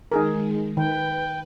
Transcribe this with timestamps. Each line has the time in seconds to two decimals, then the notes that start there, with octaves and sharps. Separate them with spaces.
0.12 D#3 G#3 D#4 G#4 A#4
0.77 D#3 B4 G5